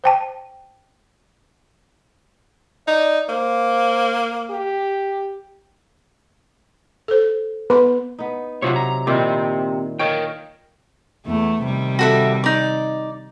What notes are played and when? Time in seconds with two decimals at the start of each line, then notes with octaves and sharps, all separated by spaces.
0.04 C5 G5 A5
2.87 D#4 D5
3.29 A#3 C5
4.50 G4
7.08 A4 C5
7.70 B3 B4 C6
8.19 B3 D#4
8.62 C3 F#3 F4 C#5
8.76 A#5
9.07 A#2 D#3 C4 E4 G4
9.99 A#4 C#5 D#5 F5 G5
11.26 E2 A3
11.63 C3 D#3 G3
11.99 F#4 A4 E5
12.44 D#4 D5